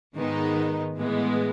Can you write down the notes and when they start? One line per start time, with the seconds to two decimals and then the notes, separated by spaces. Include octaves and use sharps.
0.17 G#2 D#3 G#3 B3 D#4
0.97 A2 E3 G#3 B3